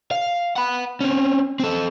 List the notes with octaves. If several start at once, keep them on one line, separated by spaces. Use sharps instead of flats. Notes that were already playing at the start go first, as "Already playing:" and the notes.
F5
F#5 B5
C4 C#4
C4 A4